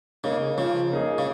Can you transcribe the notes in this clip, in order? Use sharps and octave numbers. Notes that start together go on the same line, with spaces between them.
C#3 A#3 D#4 G#4
C#3 F3
A#3 D#4 G#4
C#3